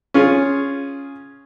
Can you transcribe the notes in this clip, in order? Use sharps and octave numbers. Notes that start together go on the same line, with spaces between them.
C#4 F4 G#4